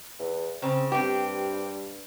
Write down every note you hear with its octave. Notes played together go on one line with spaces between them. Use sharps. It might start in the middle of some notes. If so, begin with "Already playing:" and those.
E2
C#3 C4
G2 C4 G4